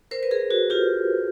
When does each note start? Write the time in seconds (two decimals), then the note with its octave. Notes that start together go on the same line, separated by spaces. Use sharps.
0.11 A#4 C5
0.23 B4
0.31 G#4 A#4
0.51 F#4 G#4
0.70 F4 G4